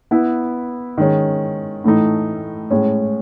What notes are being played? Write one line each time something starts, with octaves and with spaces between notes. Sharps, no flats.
B3 E4 B4
D#3 G#3 C#4
A2 E3 A3 D#4
A2 G#3 C#4